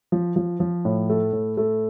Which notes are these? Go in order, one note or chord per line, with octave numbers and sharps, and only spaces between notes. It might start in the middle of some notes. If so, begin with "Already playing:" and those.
F3
F3
F3
A2
A3
A2
A3